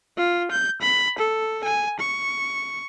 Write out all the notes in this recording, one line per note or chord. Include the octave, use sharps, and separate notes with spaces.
F4
G6
B5
A4
G#5
C#6